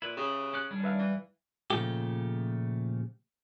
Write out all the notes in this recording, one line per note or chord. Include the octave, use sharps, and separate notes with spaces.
A#2 E4 B4
C#3 G4
C#4 D6 F#6
D#3 G3 C#4 D4
B4 E5 F5
E3
A#2 C#3 F3 A3 G4